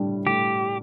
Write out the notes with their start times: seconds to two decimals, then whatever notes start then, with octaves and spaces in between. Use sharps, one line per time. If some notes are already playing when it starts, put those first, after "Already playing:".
Already playing: A2 G3 D4
0.26 A2 G4